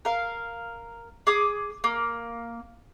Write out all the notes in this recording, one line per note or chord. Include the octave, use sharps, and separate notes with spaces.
A#4 F5
G#4 D6 D#6
A#3